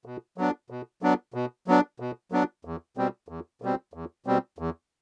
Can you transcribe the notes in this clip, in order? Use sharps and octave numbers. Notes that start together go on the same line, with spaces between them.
B2
F#3 B3 D4
B2
F#3 B3 D4
B2
F#3 B3 D4
B2
F#3 B3 D4
E2
B2 G3 C4
E2
B2 G3 C4
E2
B2 G3 C4
E2